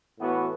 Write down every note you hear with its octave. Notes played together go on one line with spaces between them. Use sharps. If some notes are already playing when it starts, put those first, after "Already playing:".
A2 E3 B3 F#4